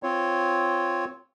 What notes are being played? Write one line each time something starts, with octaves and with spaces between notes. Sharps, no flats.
C4 F4 C#5